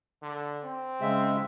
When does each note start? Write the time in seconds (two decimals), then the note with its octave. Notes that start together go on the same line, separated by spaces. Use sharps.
0.22 D3
0.64 C4
1.01 C#3 G#3 E5